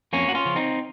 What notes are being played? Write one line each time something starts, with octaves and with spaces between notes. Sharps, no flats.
F2 A#3 C#4
F#4
C#4 F4
C#3 F3
C4 D#4